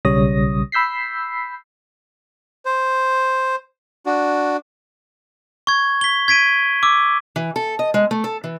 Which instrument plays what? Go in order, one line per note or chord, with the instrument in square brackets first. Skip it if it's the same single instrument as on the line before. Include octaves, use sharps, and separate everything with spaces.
[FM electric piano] B1 C#3 G3 C#5 D#6 A#6
B5 E6 G6 B6 C7
[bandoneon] C5
D4 F#4
[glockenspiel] C#6 G#6
B6 G7
G#6 B6 D7 D#7
D6 E6
[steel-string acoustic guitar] E3
A4
D#5
G#3
A3
A4
E3